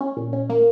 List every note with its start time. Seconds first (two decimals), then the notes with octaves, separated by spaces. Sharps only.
0.01 C#4
0.17 A#2
0.33 C#4
0.50 A#3